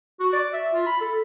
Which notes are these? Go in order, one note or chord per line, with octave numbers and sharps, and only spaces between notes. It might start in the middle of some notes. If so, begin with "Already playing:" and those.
F#4
D5
E5
F4
B5
A4